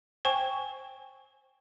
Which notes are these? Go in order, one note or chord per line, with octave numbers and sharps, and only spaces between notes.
C5 G5 G#5 C#6